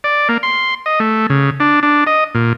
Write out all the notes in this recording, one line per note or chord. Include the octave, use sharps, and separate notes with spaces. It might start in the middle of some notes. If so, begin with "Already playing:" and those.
D5
A#3
C6
D#5
A3
C#3
D4
D4
D#5
A#2